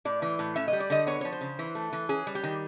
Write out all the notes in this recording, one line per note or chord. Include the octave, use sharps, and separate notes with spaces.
A2 D5
E3
A2
C#4 E5
D#5
G3
D5
D3 D#5
B3 C#5
F3 C#5
C5
C#3
E3
A3
E3
C#4 G#4
G3
G4
D#3